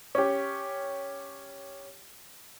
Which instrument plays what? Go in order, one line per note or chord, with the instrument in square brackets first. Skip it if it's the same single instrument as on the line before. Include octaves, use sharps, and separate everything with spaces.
[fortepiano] C#4 G4